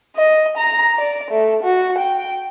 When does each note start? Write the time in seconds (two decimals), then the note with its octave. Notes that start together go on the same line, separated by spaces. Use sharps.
0.16 D#5
0.57 A#5
0.98 D5
1.31 A3
1.63 F#4
1.98 G5